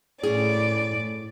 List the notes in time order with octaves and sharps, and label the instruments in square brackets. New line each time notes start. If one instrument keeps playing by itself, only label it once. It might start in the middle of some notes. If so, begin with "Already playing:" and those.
[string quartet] A2 D5 [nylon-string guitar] C#4 G#4